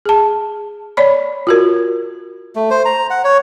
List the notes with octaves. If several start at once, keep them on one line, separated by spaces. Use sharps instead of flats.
G#4 A5
C#5 D5 B5
F4 F#4 A#4
A3
C5
A#5
F#5
C#5